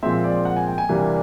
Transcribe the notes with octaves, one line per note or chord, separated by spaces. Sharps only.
A#2 F3 G#3 C4 E5
D5
F#5
G#5
G5
G#5
C3 E3 G3 A#3 D4